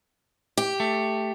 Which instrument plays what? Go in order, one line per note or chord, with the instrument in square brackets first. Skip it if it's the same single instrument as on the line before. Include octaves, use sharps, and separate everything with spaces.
[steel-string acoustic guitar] G4
[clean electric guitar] A3